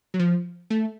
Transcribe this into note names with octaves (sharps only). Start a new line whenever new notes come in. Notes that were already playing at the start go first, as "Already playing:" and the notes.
F#3
F3
A3